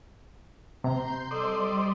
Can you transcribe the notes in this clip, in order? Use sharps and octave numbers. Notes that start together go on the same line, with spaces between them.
C3 A#5 C6 G6
G3 A4 C5 D5 D#5